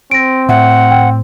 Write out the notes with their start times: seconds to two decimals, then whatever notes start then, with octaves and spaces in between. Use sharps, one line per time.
0.11 C4 A#6 D7
0.49 A2 E5 F#5
0.91 G5